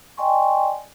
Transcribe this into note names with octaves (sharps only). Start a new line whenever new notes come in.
D5 D#5 G5 G#5 C6 C#6